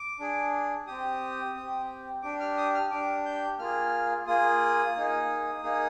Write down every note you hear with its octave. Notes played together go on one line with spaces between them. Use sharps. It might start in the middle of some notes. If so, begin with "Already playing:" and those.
Already playing: D6
D4 G#4
C4 G4 D#6
C4 G4
D4 G4 D6
F6
D#6
F6
D4 G4 D6
G6
A#3 F4 G#4 F6
A#3 F4 G#4 D#6
A#3 D#4 G#4
A#3 D#4 G#4